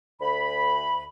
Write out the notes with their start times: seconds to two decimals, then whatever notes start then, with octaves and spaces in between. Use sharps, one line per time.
0.21 D2 B5